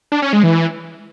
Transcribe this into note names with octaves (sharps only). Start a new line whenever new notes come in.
D4
C#4
G#3
E3